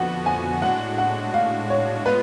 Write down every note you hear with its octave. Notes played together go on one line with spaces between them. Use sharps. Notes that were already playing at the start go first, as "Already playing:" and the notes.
Already playing: F2 D3 F3 B3 F#4 F#5
G#5
A2 G#3 D4 F#4 F#5
F#5
F5
C#5
A2 G#3 B3 F4 B4